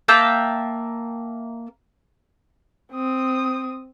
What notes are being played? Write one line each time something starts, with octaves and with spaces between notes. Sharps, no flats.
A#3 E5 G5 A5
C4 D#6